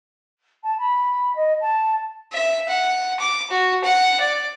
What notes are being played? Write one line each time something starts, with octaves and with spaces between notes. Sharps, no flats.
A5
B5
D#5
A5
E5
F#5
D6
F#4
F#5
D5